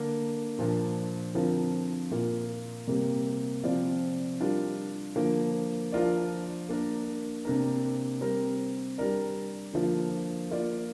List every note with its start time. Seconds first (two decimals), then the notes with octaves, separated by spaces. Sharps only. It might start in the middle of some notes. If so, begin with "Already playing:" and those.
Already playing: D3 A#3 D4
0.59 A#2 F3 D4 A#4
1.34 D3 F3 C4 F4 A#4
2.11 A#2 A#3 F4
2.87 C3 G3 A#3
3.64 C3 F3 C4 F4 D5
4.40 G3 D4 F4 A#4
5.16 D3 F3 A#3
5.92 F3 D4 F4 A#4 D5
6.69 A#3 D4 A#4
7.45 C3 A#3 D4 A#4
8.21 G3 C4 A#4
8.98 G3 D4 A#4 D5
9.73 D3 F3 A#3 F4
10.51 A#3 F4 D5